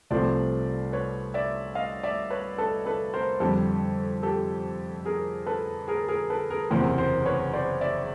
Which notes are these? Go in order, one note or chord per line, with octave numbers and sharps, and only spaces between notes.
C2 C3 F3 A3 C5 D5
B4 C#5
D5 E5
D#5 F5
D5 E5
B4 C#5
A4 B4
A4 B4
A#4 C5
F2 D3 G3 G4 A4
G4 A4
G#4 A#4
A4 B4
G#4 A#4
G#4 A#4
A4 B4
G#4 A#4
F#1 E2 C3 E3 A#4 C5
A#4 C5
B4 C#5
C5 D5
D5 E5